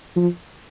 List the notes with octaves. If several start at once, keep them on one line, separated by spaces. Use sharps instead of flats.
F3